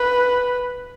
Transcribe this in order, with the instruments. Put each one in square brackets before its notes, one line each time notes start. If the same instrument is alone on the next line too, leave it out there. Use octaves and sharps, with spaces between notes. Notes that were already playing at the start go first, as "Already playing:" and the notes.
Already playing: [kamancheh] B4